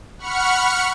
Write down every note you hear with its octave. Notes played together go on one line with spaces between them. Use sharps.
F#5 B5 C#6 F6 C#7